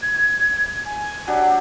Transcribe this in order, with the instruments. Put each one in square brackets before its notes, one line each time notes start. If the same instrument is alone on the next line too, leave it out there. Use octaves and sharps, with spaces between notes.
[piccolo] G#6
G#5
[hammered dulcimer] F#3 D4 G4